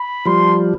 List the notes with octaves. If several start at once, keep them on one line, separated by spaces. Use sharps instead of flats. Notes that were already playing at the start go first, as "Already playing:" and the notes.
Already playing: B5
F3 G3 C6